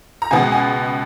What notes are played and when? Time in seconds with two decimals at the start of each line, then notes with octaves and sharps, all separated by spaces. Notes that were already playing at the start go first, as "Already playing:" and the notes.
0.22 A#5
0.31 C#2 B2 G#3 B3 G#5
0.52 G#5